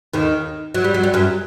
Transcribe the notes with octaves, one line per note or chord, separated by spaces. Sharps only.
D#2 D#3
F#3
G3
F#3
G3
F#2 F#3